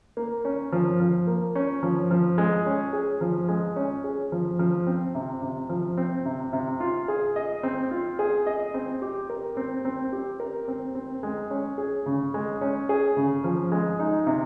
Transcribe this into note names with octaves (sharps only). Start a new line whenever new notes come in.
A#3
C#4
F3
F3
A#3
C#4
F3
F3
G#3
C#4
G#4
F3
G#3
C#4
G#4
F3
F3
C4
C3
C3
F3
C4
C3
C3
F4
G#4
D#5
C4
F4
G#4
D#5
C4
G4
A#4
C4
C4
G4
A#4
C4
C4
G#3
C#4
G#4
C#3
G#3
C#4
G#4
C#3
F3
G#3
D#4
C3